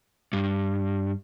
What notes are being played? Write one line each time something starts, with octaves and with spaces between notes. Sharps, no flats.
G2